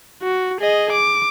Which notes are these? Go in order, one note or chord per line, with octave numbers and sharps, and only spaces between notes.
F#4
G#4 D#5
D6